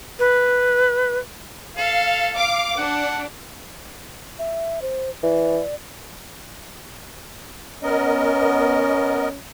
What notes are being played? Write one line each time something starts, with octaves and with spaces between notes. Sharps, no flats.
B4
A4 F5
F5 D6
D4 F#5
E5
C5
E3 D5
B3 C#4 A#4 D#5